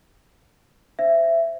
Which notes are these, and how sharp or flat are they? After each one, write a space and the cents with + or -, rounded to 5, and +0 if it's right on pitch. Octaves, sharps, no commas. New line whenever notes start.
C5 +0 E5 +15